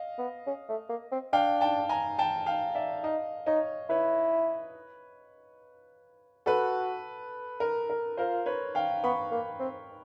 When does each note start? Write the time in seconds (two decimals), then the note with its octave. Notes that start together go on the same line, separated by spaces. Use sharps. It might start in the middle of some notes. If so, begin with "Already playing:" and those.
Already playing: D#5 F5
0.19 B3
0.47 C#4
0.69 A3
0.89 A#3
1.12 C4
1.33 D4 F5 G5
1.61 G5 A5
1.89 G#5 A#5
2.18 G5 A5
2.46 F5 G5
2.75 D5 E5
3.03 D#4 D#5 F5
3.46 D#4 C#5 D#5
3.89 E4 B4 C#5
6.46 F#4 A4 B4
7.60 A#4
7.90 A#4
8.17 F4 A#4 C5
8.46 B4 C#5
8.75 F5 G5
9.04 B3 B5 C#6
9.32 A#3
9.60 C4